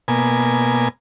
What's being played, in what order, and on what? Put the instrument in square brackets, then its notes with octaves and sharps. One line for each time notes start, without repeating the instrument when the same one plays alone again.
[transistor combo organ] B2 A#3 G#5